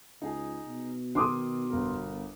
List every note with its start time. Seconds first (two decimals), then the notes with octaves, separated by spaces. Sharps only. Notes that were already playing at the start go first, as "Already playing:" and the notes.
0.22 C#2 D#4 G#4
0.67 B2
1.15 D#3 C6 D6 D#6
1.70 G1 B3 A#4